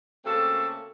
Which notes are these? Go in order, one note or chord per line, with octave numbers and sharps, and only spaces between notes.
C#3 A3 A#3 C4 F#4 A4